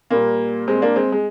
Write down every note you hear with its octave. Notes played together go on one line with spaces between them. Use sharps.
A#2 G3 A#3
G#3 C4
A#3 D4
G#3 C4
G#3